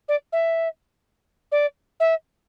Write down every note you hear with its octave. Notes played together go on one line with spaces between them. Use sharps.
D5
E5
D5
E5